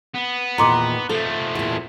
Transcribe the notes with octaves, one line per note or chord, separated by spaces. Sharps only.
B3
E2 A#2 D#3 A#5 C6 D6
F3 A3 A4
E2 A#2